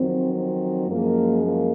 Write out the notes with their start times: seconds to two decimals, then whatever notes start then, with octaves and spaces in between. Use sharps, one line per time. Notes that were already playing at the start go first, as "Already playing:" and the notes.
Already playing: F2 D#3 F#3 C4
0.33 C4
0.88 F#2 F3 G#3 A#3
1.43 A#3